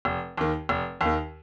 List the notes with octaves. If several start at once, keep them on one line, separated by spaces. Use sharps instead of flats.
F1
D#2 D#3
F1
D#2
D#3